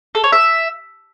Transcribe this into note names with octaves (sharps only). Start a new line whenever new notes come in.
A4
C#5
E5